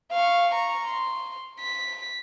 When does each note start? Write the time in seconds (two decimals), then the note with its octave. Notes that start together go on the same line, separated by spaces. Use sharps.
0.12 F5 C#6
0.53 A#5 C#6
0.88 C6
1.61 B6